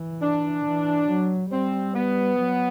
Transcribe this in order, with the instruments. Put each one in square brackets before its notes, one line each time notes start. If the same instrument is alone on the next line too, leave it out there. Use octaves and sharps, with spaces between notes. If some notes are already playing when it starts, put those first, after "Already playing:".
Already playing: [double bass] E3
[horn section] D4
[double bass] E3
F#3
[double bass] G3 [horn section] C4
[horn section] B3
[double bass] F#3